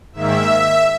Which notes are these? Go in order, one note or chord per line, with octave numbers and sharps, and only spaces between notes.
G#2 D#3 A#3 E5